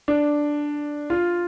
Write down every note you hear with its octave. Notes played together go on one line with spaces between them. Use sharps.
D4
F4